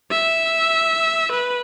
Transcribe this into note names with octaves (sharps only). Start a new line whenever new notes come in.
E5
B4